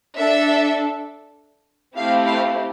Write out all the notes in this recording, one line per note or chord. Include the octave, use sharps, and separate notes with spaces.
D4 A4 E5
A3 C4 E4 G4 F5
F5